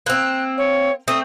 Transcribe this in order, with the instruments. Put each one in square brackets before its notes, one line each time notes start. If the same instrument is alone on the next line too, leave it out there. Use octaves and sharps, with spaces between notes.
[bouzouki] A#3 C4 [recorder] F#6
[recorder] C#5
[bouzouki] A3 C4 [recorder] D#6